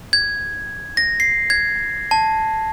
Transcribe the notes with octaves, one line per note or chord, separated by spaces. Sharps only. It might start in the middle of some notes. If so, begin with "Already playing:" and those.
G#6
A#6
C7
G#6
A5